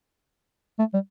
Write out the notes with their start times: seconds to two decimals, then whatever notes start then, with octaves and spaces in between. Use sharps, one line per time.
0.79 A3
0.94 G3